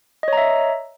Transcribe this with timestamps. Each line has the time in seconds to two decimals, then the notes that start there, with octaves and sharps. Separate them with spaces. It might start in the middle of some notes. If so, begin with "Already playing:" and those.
0.23 D#5
0.28 C#5
0.33 A#5
0.37 E5